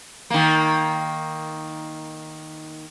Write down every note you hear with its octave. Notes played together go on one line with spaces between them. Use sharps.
D#3 A#3